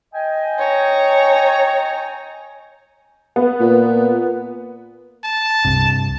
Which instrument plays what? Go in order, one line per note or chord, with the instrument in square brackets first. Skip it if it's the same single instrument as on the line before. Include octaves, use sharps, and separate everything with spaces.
[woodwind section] D#5 G5 G#5
[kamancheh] C#5 A#5
[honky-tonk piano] B3
[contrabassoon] A#2
[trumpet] A5
[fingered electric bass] C2 G2 C3